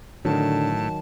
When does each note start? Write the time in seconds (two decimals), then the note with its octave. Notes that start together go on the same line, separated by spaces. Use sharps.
0.25 A2 D3 D#3 F#3 A5